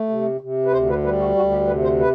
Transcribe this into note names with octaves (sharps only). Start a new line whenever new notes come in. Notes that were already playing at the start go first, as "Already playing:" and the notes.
Already playing: A3
C3
C3
B4
D2 C5
B4
G3 B4
F#4
D2 F#4
G4
C3 B4
C5
B4